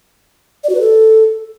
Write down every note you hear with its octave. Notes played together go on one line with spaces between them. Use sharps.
D5
F#4
B4
A4